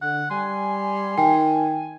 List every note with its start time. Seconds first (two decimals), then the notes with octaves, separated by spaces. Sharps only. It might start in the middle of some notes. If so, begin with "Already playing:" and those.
0.02 D3 F#5
0.31 G3 G#5 C6
1.18 D#3 G5